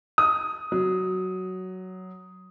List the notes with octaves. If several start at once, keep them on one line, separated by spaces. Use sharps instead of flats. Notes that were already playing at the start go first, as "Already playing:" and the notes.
D#6
F#3